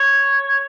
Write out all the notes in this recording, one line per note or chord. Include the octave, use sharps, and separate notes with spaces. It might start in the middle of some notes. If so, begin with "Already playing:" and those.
Already playing: C#5